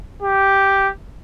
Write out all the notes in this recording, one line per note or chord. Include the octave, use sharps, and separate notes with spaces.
G4